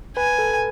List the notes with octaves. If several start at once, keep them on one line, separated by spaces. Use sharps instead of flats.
B4 G#5
A4